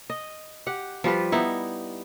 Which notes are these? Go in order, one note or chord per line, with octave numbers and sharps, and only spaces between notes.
D#5
G4 F#5
F3 G3 F4 B4
B3 D#4 E4